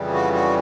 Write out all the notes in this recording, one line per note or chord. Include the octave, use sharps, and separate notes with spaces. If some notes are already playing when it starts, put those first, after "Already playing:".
Already playing: F2 C#3 E3 G3
F#4
F#4